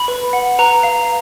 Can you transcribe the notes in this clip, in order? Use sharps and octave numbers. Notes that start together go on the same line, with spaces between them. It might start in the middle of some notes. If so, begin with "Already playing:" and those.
Already playing: B5
B4
F#5
B4 A#5
F5